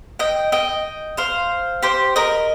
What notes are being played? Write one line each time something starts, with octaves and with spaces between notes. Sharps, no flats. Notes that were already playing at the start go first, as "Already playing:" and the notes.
D#5 G5
D#5 G5
C5 F5
G4 C5
A#4 D#5